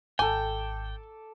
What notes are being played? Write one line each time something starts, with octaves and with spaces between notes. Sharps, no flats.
G#1 A4 G5 G#5 D6